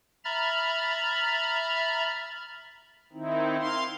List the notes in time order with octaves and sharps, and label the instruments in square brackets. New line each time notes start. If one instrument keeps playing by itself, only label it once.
[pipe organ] E5 A#5 B5 F6 A6
D#3 C4 D#4 E4
F5 C6